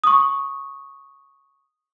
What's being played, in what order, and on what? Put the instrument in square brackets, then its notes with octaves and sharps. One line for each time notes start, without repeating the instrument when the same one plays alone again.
[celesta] C#6 D#6